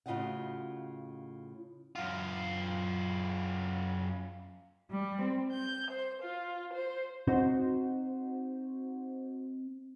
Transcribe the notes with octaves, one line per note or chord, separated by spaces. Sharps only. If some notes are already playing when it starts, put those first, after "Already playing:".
A2 C#3 F4 F#4 D#5 F#5
F#2 F4
G3
C4
G6
C5
F4
C5
C4 D#4 F#4 C5